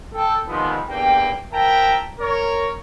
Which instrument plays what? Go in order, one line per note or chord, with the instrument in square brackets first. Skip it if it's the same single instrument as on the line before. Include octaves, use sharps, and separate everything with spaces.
[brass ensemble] A4 G5
D#3 F3 G3 G#3 B3 C4
E2 G2 A#3 G5
F3 A#4 E5 G5 A5 A#5
A#4 C#5